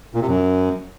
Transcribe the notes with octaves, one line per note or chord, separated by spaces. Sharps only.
A#2
C3
F#2